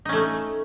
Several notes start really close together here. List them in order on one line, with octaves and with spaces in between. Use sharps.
D#4 C#4 A3